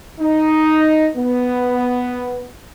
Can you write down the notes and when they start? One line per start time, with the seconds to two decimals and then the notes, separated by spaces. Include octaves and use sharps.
0.20 D#4
1.16 B3